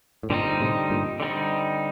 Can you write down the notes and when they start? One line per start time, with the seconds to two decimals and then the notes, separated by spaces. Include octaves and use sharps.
0.23 A2
0.30 G2 A#2 D3 G3 C4 D#4
0.60 A2 C3
0.90 G2 A#2
1.20 D3 G3 C4 D#4